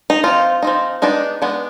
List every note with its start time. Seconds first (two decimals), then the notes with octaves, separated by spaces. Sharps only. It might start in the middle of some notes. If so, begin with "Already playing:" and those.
0.10 D#4
0.24 F3 C4 D#4 F4
0.63 F3 C4 D#4
1.02 G#3 B3 D4 D#4
1.42 G#3 B3 D4